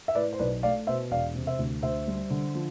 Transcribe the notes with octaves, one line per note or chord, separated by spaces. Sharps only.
E5
A2 B4 D5
C5
B1 B4 D5
A3 D5 F5
B2 C5 E5
E1 D5 F5
C3
C5 E5
D2
D2 C5 E5
G3
D3
F3